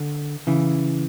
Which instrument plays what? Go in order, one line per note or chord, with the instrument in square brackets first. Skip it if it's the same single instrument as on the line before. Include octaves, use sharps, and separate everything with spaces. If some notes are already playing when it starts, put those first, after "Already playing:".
Already playing: [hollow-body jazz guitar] D3
C#3 E3